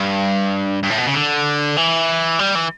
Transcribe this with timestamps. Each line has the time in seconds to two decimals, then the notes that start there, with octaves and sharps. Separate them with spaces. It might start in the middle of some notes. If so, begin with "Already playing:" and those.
Already playing: G2
0.84 G2
0.90 A2
0.98 B2
1.07 C#3
1.14 D3
1.77 E3
2.39 G3
2.55 E3